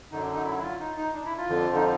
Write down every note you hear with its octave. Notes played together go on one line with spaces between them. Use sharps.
F#2 D3 F#3 D#4
D4
D#4
E4
E4
F4
D#4
D#4
D4
E4
F4
F2 D3 F3
D#4